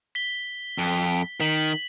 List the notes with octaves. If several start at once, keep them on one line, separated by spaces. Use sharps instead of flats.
B6 G7
F2
D#3 B6 F#7